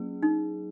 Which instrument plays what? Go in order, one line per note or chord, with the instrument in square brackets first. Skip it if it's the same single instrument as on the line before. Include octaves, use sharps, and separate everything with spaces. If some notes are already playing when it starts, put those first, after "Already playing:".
Already playing: [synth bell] F#3 A#3 C#4 G#4
[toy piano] D#4